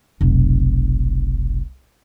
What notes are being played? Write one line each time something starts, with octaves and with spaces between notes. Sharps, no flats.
F1 B1